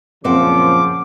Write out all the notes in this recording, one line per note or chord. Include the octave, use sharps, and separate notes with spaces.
F#2 A#2 C#3 F3 C4 F#5 D6